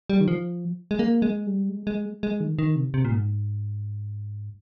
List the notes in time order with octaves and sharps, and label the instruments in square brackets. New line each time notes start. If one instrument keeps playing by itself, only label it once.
[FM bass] G3
D#3
F3
G#3
A#3
G#3
G3
G#3
G#3
G#3
D#3
D#3
C3
C3
A#2
G#2